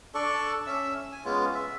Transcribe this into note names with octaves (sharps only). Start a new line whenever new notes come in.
D4 A4 D5 C#6
C#4 E5 E6
G#5
G#3 B3 C#4 F4
E5